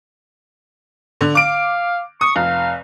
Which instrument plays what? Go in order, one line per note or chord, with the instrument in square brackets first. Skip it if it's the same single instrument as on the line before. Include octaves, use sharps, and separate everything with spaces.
[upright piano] D3
[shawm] F5 [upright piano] D6 D7
[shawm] C#6 [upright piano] D#6
[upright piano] F1 [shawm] F5